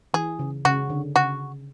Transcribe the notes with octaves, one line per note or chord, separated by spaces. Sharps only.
E3 G#4
C#3
C#3 F#4
D3
C#3 F#4